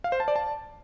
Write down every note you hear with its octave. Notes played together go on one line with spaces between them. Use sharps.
F5
C5
A5
D5
A5